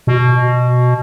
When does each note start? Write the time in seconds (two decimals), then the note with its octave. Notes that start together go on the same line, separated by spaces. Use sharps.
0.07 B2